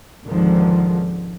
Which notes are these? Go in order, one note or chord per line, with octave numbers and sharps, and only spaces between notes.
G#1 C#2 G#2 D3 D#3 F3